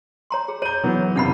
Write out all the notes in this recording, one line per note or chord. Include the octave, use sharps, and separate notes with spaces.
C#5 A#5 C6
G#4
C#5 A#5 G6 D#7
E3 F#3 B3
F#1 D#2 C3 D#4 F#5 B5